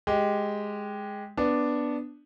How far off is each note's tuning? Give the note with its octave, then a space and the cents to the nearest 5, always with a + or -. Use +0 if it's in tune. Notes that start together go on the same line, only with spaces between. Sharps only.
G#3 +0 G4 +0
B3 +0 D4 +0